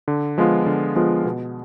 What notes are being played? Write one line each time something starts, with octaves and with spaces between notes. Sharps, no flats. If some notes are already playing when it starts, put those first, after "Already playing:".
D3
F3 G#3 B3 F4
D3
F3 G#3 B3 F4
B2